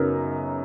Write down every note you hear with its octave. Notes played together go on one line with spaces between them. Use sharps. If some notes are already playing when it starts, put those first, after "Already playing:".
Already playing: F#2 C#3 F#3 B3 D#4 A#4